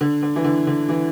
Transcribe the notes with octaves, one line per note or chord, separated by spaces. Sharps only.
D3
D3
E3
D3
D3
E3